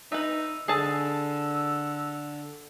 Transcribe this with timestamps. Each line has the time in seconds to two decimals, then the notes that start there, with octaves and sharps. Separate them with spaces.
0.12 D#4 B4 E5
0.68 D3 G#4 A5 E6